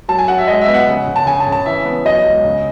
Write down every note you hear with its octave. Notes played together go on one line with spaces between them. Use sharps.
F#3 A5
G#5
F#3 F#5
E5
G#3 D#5
E5
B3
F#5
C#3
C#3
A5
C#3 G#5
A5
C#3
A5
E3 E5
B3
F#3 D#5
C#2
C#3